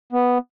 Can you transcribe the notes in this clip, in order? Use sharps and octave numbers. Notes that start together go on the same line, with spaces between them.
B3